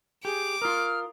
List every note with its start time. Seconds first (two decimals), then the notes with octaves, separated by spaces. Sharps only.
0.25 G4 G#4 D6
0.62 F4 A#4 D#6 F6